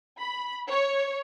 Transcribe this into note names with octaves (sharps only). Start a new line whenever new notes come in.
B5
C#5